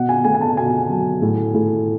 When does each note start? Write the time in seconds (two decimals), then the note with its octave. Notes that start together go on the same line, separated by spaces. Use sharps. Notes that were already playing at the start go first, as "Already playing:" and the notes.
Already playing: B2 F#5
0.09 G#5
0.24 A3 G#5
0.34 G#5
0.41 A5
0.57 B2 G#5
0.89 F#3
1.22 A2
1.54 A2